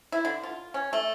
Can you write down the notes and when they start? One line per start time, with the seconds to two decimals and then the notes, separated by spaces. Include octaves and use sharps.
0.12 E4
0.25 D3
0.43 F4
0.74 C#4
0.93 A3